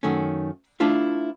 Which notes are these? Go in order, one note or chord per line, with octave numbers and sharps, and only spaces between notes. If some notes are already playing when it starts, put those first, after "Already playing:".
F#2 D#3 A3 C#4
A3 D4 E4 F4 B4